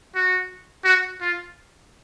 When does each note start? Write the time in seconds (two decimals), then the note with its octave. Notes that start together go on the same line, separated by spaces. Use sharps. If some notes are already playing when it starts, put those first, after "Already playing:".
0.15 F#4
0.84 F#4
1.21 F4